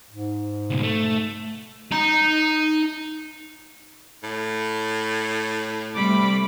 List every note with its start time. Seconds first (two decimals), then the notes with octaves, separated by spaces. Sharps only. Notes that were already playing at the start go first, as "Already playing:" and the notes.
0.11 G#2
0.70 C#2 B2
0.83 A3
1.92 D#4 A#5
4.23 A2
5.94 C3 G3 A3 B5 D6